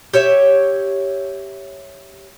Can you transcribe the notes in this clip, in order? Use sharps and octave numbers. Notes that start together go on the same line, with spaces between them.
G4 C#5 E5